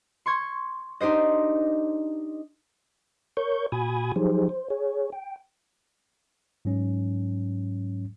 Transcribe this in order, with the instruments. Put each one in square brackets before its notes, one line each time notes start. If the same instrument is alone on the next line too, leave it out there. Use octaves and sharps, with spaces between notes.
[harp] C6 C#6 G#6
D4 D#4 G4 C5 D#5
[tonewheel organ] A#4 C#5 C#6 G6
A#2 F#4 G#5 B5 D#6 G#6
F3 F#3 D#4 G4 G#4 C5
C5
G#4 C#5
G5
[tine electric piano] G#2 F#3 C#4